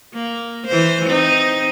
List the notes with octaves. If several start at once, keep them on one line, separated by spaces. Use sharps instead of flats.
A#3
E3 C5
C4 D#4